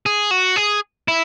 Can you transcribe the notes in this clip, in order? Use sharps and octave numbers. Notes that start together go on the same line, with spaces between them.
G#4
F#4
G#4
E4